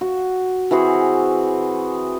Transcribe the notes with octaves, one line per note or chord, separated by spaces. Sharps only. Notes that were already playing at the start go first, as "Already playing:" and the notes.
F#4
E3 C4 F#4 G#4